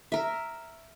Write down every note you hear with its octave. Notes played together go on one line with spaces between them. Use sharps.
A#4 E5